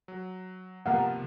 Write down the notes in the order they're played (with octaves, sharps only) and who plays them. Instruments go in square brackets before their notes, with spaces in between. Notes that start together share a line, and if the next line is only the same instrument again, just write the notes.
[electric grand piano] F#3
[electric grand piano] C3 F3 B3 [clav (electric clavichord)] A#3 F5 F#5